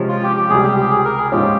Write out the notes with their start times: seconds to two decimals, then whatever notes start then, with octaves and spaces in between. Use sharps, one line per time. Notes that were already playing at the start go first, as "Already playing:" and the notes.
Already playing: C3 F3 G#3 C#4
0.09 F4
0.23 G4
0.37 G4
0.50 C#2 C3 G3 G#4
0.64 G4
0.77 G4
0.91 G#4
1.05 A#4
1.18 G#4
1.32 G#2 F3 G#3 C#4 F4 G4